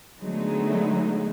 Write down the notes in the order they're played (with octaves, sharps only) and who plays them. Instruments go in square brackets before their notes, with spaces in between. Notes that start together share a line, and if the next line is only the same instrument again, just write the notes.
[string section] D3 F#3 G#3 A3 B3 D#4